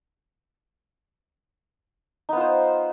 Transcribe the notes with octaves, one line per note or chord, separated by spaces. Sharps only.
B3 D#4 F4 C5